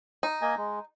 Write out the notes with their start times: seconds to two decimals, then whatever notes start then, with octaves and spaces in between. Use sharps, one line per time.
0.23 D#4
0.42 A#3 D#5 G#5
0.57 G#3